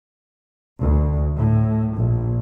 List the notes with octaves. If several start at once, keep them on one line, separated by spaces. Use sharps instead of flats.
D2
A2
A#1